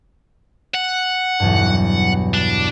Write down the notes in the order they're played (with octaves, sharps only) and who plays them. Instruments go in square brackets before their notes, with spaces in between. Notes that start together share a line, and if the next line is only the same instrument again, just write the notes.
[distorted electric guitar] F#5
[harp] B1 E2 G2
[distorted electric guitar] D4